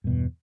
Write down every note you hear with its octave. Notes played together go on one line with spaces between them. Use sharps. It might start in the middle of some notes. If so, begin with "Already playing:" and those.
E2 G2 B2